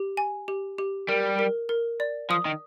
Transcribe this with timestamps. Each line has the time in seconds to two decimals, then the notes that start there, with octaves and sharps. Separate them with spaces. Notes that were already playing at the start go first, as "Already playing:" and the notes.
Already playing: G4
0.17 G#5
0.48 G4
0.78 G4
1.09 G3 A#4
1.39 A#4
1.69 A#4
2.00 D5
2.30 F3 D#6
2.45 D#3